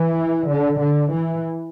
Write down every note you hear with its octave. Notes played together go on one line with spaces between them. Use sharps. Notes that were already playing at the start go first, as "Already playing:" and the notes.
Already playing: E3
D3
D3
E3